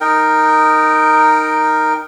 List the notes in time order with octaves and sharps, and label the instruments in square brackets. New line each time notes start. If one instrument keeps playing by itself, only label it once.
[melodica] D#4 A#4 G5